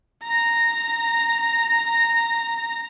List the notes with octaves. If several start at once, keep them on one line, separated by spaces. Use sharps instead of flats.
A#5 A#6